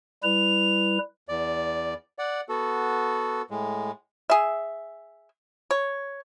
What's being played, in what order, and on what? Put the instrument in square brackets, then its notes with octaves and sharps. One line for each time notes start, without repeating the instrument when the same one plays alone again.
[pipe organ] G3 E4 B4 [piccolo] F7
[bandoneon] E2 D5
D5 F#5
B3 F#4 A4
A2 G#3
[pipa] G#4 E5
C#5